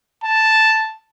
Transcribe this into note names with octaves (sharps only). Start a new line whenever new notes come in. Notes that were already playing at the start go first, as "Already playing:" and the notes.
A5